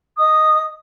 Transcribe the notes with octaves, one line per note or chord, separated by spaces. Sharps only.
D#5 D#6